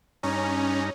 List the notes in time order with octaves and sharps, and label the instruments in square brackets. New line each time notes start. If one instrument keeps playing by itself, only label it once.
[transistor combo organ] G2 D#4 A#5 [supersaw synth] C#4